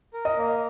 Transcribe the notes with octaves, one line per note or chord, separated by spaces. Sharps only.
A#4
D#5
A#3